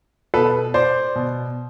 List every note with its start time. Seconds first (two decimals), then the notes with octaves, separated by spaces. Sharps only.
0.34 B2 A4 B4
0.74 C5 D5
1.15 B2